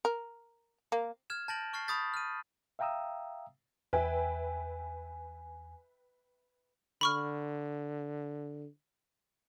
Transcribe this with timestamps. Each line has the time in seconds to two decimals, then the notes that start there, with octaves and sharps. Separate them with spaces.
0.05 A#4
0.92 A#3
1.30 F6 G#6 E7
1.48 A5 G6 A6 A#6 D7 F#7
1.73 C#6 F6 A6 C7
1.88 B5 C#6 D#6 G6 A6 B6
2.14 F6 D#7
2.79 E5 F5 G5 A#5 D#6 E6
3.93 E2 B4 E5 G5 G#5
7.01 D3 B5 C#6 F6